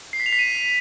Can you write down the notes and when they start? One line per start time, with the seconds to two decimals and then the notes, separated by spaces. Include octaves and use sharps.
0.13 C7
0.20 B6
0.26 F7
0.32 B6
0.39 D#7